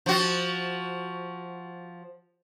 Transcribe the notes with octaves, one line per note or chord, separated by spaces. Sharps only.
F3 F#4